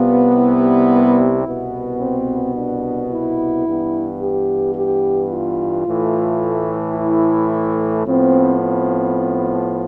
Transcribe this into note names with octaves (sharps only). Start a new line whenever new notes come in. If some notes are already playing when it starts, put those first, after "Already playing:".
Already playing: C2 C3 G3 B3 F4
E4
C2 B2 B3
C4
D4
E4
G2 E3 B3
G4
G4
F4
A2 E3 A3
E4
A2 F3 B3 C4
C4